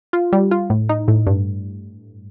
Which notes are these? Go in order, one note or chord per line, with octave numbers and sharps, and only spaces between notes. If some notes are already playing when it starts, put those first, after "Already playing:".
F4
G3
F4
A2
D#4
A2
G2